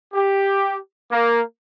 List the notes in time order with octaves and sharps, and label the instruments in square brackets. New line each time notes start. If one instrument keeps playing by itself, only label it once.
[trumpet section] G4
A#3